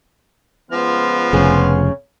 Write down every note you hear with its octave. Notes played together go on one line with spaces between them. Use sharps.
C#2 F3 B3 C6 F6
F1 C#3 G#4